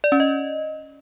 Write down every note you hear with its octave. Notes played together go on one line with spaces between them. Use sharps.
D5
C#4
D#5